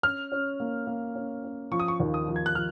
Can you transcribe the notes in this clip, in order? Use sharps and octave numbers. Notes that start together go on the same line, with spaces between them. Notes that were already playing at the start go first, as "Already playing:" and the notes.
C#4 F6
C#4
A#3
A#3
C#4
C#4
F3 C#6
D#6
C#6
D#2
D#6
F3
G#6
F#6
F3 F6